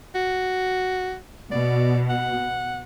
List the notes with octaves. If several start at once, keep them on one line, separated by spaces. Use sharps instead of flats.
F#4
B2 D5
F#5